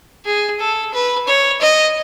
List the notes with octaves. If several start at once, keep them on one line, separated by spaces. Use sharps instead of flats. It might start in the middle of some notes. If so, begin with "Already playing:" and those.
G#4
A4
B4
C#5
D#5